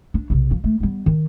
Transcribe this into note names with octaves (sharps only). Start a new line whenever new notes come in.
D4
B1 C3
F3
A3
G3 B3
D#3